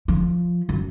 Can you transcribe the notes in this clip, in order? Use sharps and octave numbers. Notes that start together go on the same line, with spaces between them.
F3
F#2